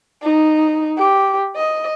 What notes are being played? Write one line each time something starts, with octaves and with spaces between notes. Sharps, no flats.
D#4
G4
D#5